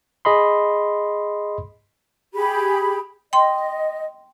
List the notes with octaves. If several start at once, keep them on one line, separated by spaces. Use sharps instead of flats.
G#4 D#5 B5 C6
G4 G#4 B5
D#5 G5 C6